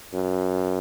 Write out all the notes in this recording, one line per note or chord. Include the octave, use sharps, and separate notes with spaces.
F#2